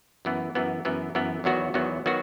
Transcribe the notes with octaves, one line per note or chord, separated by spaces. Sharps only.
F#2 E3 B3
F#2 E3 B3
F#2 E3 B3
F#2 E3 B3
E2 D#3 F#3 B3 F#4
E2 D#3 F#3 B3 F#4
D#3 F#3 B3 F#4